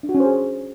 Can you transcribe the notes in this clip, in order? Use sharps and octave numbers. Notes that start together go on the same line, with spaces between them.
D4
F#4
C#4
C5
G#4